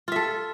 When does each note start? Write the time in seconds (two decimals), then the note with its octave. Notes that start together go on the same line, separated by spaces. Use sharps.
0.08 F4
0.12 E5
0.16 A4